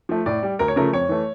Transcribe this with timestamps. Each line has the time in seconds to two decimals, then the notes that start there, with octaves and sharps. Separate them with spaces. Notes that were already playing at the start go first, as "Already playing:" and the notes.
0.09 F3 A3
0.26 A2 D5
0.43 G3
0.59 D2 A#4
0.68 C#5
0.76 C#3 F3 A3 A#4
0.93 F2 C#5
1.09 E3 A3